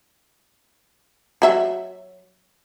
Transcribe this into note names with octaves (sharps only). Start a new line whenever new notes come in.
F#3 E5